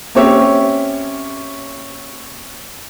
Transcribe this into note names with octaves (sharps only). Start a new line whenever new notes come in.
A#3 C4 C#4 G4 C#5 E5